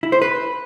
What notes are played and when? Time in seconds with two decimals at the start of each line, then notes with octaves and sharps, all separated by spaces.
0.03 E4
0.12 C5
0.22 B4